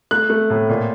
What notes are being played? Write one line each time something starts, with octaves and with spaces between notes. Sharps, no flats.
A3 F#6
A3
A2
A#2